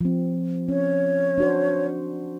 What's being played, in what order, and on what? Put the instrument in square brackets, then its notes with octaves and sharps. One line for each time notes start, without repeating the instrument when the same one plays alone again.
[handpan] F3 C4
[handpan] C#4 [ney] C#5
[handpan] D4 F#4 C5